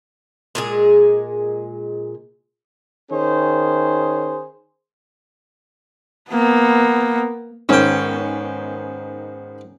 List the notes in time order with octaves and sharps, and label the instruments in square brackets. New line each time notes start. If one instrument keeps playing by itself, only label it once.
[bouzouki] A#2 G#3 G#4
[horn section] D#3 C#4 G#4 C5
[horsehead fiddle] A#3 B3
[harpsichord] G#2 G5 [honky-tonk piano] D#3 B3 [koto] C#4